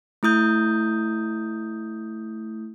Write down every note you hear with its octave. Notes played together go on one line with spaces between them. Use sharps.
A3 E4 D#6 G6